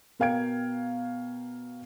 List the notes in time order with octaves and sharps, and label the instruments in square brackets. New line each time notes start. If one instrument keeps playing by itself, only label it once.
[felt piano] B2 A#4 F5 G5 G#6 D7